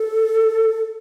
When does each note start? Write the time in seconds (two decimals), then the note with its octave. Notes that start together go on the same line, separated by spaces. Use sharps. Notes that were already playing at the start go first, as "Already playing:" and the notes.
Already playing: A4